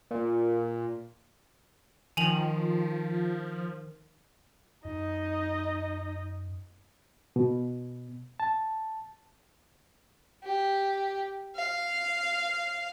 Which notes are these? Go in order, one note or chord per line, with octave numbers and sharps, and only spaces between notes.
A#2
D#3 F3 G#5 F7 F#7
F#2 D#4 D#5
B2
A5
G4
F5